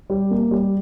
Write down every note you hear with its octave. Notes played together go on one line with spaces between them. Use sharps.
G3
A#3
G3